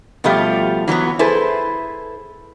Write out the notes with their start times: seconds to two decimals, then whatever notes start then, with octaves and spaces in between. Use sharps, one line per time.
0.24 B2 F3 G3 A3 F4 G4
0.87 E3 F#3 G#3 B3
1.19 E4 G#4 A4 B4 C5